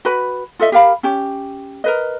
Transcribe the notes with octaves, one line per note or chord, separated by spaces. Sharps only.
F#4 B4 B5
F4 A4 D#5 E5
G4 A#4 F5 B5
C#4 G4
A#4 B4 D#5